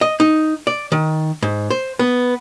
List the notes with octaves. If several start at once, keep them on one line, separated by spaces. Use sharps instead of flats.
D#5
D#4
D5
D#3
G#2
C5
B3